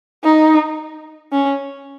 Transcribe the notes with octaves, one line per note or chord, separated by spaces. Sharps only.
D#4
C#4